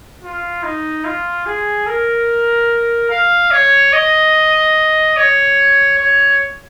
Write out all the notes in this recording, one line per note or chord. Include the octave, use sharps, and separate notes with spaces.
F4
D#4
F4
G#4
A#4
F5
C#5
D#5
C#5
C#5